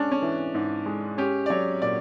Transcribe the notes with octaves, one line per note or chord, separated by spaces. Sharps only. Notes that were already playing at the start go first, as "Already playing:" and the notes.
Already playing: G#3 C#4 D4
C#4
E3
G#2
G#3
C#4 G4
D5
F#3 C#5
A#2 D5